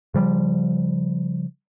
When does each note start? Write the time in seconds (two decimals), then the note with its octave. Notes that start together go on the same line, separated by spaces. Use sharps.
0.14 C#3 F3 G3